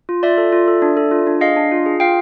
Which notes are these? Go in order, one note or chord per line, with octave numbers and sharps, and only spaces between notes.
F4
F4 D5 E5
A4
F4
A4
D4
A4
F4
D4
G#4 D#5 F5
D4
F4
G#4
F4 F5 G5